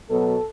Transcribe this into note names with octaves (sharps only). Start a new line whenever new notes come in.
B2 F#3 B3 A4